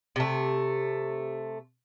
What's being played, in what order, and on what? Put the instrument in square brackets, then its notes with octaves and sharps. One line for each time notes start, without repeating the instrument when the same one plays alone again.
[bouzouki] C3 A3